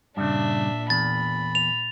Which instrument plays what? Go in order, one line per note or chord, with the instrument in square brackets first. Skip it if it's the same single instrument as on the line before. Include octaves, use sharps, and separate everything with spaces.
[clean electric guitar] G2 C#3 [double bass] A#2 [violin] D4 E5
[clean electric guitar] E2 [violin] B5 [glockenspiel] A6
[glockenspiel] F7